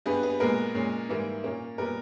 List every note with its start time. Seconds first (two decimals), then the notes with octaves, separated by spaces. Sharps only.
0.06 G2 G3 B3 G#4 B4
0.23 G#4 B4
0.40 A#2 G#3 B3 A#4
0.75 A#2 G#3 C#4
1.09 G#2 E3 G3 A#3
1.43 A#2 A#3 C#4
1.78 A#2 G3 B3 A#4